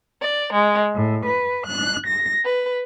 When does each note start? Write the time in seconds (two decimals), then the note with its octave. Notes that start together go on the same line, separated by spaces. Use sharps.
0.21 D5
0.52 G#3
0.96 A2
1.27 B4
1.68 F#6
2.08 A#6
2.45 B4